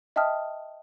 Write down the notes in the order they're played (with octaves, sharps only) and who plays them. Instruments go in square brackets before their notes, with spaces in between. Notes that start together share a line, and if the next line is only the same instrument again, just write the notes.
[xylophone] D#5 E5 G5 A5 D#6 F6